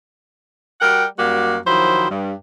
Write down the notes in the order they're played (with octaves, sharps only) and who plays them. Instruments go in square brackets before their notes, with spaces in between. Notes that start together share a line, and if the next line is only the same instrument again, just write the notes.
[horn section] G3 F#4 A#4 F#5 G5
F#2 G3 A#3 F#4 G4
D#3 F3 F#3 E4 C5
G2